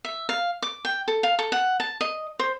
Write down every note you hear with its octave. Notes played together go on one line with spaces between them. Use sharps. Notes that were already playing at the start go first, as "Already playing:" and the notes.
E5
F5
D6
G5
A4
F5
A4
F#5
A5
D#5
C5